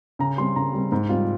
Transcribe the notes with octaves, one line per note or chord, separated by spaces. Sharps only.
C#3 A#5
G3 C4 C6
C#3 A#5
G3 C4
G#2
G3 C4 F4